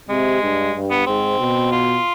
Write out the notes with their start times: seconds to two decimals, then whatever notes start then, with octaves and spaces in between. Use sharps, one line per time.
0.09 C3 G#3
0.42 G2
0.74 G2
0.90 B3
1.06 G#2 C4
1.39 B2
1.72 F4